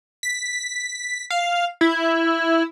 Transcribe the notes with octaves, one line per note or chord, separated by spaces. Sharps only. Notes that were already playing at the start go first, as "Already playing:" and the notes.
B6
F5
E4